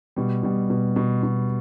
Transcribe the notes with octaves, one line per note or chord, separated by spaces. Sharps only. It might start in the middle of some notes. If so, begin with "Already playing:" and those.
B2 G3
B2 G3
B2
B2
B2